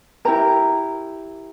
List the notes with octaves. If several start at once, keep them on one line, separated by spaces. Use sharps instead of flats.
E4 G4 A#4 A#5